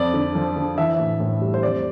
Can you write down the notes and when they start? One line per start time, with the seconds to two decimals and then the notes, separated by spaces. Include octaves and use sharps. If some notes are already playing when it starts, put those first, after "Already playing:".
Already playing: F2 D5
0.14 D3
0.35 F3
0.56 D3
0.78 E3 E5
0.99 A2
1.20 A2
1.41 G3
1.54 C5
1.63 F2 D5